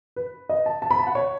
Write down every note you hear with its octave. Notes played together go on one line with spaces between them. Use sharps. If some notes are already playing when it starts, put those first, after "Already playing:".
B4
D#5
A5
A5
B5
A5
F#5
C#5